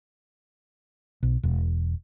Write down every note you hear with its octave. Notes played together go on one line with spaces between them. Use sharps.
B1
E1